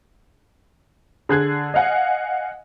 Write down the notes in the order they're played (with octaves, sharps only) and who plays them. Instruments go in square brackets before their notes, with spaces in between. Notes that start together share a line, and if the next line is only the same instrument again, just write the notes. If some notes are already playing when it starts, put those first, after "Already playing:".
[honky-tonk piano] D3 G#4 F#6 G#6
D#5 F5 F#5 G#5